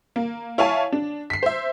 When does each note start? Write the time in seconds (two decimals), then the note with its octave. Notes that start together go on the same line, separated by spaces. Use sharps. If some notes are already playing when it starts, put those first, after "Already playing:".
0.16 A#3
0.58 E4 C#5 F5 G#5 A5
0.92 D4
1.30 B6 C7
1.43 C5 E5